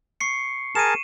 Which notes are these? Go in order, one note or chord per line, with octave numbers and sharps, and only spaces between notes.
C#6 C7 C#7
G#4 A#4 A5 D#7 E7